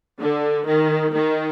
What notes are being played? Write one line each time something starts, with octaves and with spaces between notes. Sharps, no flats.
D3
D#3
D#3